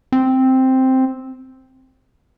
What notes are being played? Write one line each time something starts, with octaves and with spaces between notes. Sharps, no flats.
C4